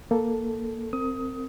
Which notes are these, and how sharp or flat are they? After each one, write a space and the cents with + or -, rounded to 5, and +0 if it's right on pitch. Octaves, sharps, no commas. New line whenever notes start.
A#3 +0 A4 +0
C4 +0 A#4 -30 D#6 +20